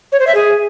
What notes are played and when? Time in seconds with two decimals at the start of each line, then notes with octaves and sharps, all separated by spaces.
0.12 C#5
0.20 C5
0.27 E5
0.35 G#4